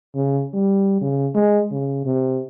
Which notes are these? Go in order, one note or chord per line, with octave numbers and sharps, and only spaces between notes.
C#3
G3
C#3
G#3
C#3
C3